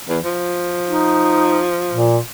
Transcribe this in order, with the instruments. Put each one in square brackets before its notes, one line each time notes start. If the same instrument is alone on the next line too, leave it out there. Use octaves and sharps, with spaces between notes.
[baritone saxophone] E2
F3
[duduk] D#4
A#2